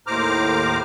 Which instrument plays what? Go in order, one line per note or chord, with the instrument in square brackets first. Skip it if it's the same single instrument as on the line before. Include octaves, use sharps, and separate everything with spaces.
[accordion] D#2 A2 C5 A#5 D6 F6